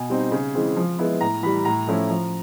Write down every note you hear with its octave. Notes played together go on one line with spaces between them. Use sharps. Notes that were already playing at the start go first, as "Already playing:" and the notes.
Already playing: B2 G#5
G3 C4 D#4
C#3
E3 G#3 C4
F3
G#3 B3 E4
A2 A#5
E3 G3 B5
A2 A#5
F3 A3 C#4 E4
F3